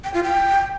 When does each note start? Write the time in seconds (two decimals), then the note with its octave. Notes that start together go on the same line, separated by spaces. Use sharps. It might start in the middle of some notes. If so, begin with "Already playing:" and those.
0.04 G5
0.14 F4
0.24 G5